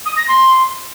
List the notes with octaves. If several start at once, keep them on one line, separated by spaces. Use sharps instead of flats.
D#6
A#6
C6